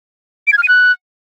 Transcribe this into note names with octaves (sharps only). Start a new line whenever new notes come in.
D7
G#6
F6
D#7
F#6